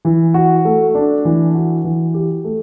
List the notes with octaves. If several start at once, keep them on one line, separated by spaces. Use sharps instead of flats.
E3
F#4
A3
D4
E3
F#4
E3
G4
A3